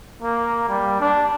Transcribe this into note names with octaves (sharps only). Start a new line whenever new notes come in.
A#3
G3
D4